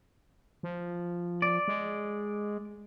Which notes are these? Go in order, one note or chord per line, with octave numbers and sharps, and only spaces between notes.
F3
D5
G#3